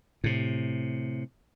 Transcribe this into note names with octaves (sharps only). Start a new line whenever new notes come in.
A2 C3